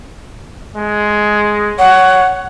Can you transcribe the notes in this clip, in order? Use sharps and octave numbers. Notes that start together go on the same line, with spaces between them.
G#3
C#5 F#5